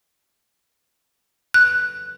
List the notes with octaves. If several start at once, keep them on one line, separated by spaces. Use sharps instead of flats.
F#6